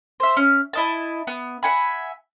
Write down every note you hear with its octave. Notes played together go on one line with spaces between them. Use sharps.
C5 E5
C#4
E4 D#5 A5
B3
E5 F#5 G#5 B5